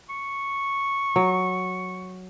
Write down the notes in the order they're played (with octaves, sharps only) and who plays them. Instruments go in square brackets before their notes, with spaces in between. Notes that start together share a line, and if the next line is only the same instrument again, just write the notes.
[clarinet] C#6
[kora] F#3